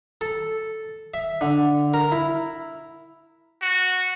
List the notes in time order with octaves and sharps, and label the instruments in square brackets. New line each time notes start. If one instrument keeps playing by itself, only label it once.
[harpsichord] A4
E5
D3
A#4
E4
[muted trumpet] F#4